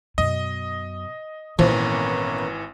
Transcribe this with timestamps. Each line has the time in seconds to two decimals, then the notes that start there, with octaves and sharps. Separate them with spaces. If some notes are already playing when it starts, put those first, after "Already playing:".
0.18 F#2 B2 D#5
1.59 G#1 A#2 E3 F3 A#3 B3 C#4